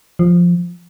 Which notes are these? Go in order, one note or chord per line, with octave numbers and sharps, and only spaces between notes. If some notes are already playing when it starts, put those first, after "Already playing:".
F3